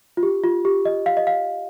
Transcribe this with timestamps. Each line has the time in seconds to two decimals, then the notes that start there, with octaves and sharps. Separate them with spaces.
0.17 F4
0.23 G4
0.44 F4
0.65 G4
0.85 D#5
1.06 F5
1.17 D#5
1.27 F5